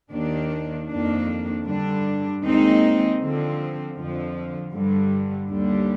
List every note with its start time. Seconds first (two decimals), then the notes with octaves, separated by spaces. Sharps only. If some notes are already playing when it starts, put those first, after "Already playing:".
0.10 D#2 D#3 A#3 D4
0.88 F2 D#3 A#3 D4
1.65 G2 D3 G3 D4
2.41 D#2 D#3 G#3 C4 D#4
3.18 D3 F3 C4
3.94 F2 D3 F3
4.72 G2 D3 G3
5.48 D#2 D3 G3